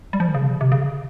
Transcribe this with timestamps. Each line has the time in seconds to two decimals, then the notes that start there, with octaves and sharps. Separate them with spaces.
0.13 G3
0.20 F3
0.28 D#3
0.34 C#3
0.43 C3
0.61 C3
0.72 C#3